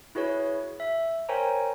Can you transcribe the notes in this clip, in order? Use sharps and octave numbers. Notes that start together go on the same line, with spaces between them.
E4 F#4 G#4 B4 C#5
E5
A#4 C5 C#5 G5 G#5 A#5